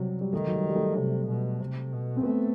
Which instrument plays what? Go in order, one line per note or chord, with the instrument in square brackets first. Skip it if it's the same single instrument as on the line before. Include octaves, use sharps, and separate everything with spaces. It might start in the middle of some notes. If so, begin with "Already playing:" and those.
Already playing: [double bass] C3 [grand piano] F#3 G3
[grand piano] G3
[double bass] D#3 [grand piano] A3
[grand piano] F#3
G3
G3
A3
[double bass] C3
B2
C3
B2
[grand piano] C4
[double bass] A3 [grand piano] B3